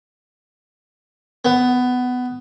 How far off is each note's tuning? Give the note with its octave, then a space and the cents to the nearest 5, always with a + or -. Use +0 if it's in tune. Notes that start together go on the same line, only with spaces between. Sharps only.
B3 +15